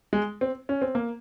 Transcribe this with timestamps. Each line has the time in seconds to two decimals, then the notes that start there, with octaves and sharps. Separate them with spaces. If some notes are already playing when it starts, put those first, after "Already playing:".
0.13 G#3
0.41 C4
0.69 C#4
0.82 C4
0.95 A#3